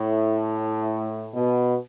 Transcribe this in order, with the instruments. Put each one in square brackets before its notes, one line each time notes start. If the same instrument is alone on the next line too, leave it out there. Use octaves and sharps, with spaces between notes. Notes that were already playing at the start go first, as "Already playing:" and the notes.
Already playing: [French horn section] A2
B2